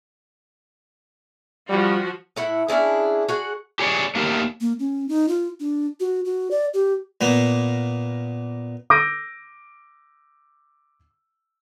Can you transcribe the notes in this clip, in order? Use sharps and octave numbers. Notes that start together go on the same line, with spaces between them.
F3 G3 F#4
A2 E4 F#5
C#4 D4 E4 G#4
F#4 G#4 F#5
G4 G#4 C#5 D5
A3 A#3 G4 A#4
A#3
C#4
D#4
F4
D4
F#4
F#4
D5
G4
A#2 A#3 B3
D6 E6 G6 A#6 D7 D#7